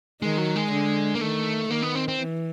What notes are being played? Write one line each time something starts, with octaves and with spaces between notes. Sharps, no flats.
D#3 G#3
F#3
G#3
D3
A#3
D#3 A3
D#3 A#3
B3
C4
C4
E3